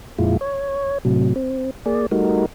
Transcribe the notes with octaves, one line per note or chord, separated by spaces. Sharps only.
F2 A#2 G#3 E4 F4
C#5
A2 C3 F#3
C4
A#3 G#4 D5
G3 A3 D#4 F#4 A#4